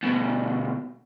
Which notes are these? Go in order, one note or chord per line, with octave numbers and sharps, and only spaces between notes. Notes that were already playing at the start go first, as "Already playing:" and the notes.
D2 B2